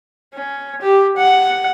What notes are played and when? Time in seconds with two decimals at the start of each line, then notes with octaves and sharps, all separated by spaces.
0.35 C#4
0.81 G4
1.17 F#5